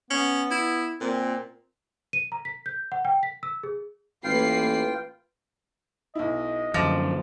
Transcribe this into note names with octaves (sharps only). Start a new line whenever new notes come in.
B3 C#4
E4
A#2 C4
D#7
A#5
B6
G6
F#5
G5
B6
E6
G#4
A1 A#3 F4 B4 G5 C7
B1 E4 D#5
F#2 D3 F3 D6 A6 A#6